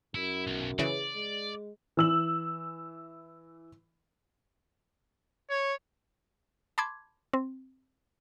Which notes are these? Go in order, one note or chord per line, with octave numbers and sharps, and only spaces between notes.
F#2 E4
B1
C#3 E3 D5
G#3
E3 E6 F#7
C#5
A5 B5 C6 D6 G#6
C4